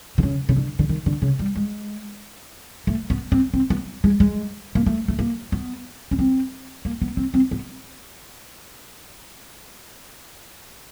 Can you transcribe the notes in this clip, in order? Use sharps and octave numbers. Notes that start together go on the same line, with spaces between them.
D3
C#3
C#3
D3
D3
D#3
D3
C#3
G3
G#3
A3
B3
C4
C4
B3
G#3
G#3
A#3
A3
A3
A#3
B3
C#4
C4
A#3
B3
C4
C4
B3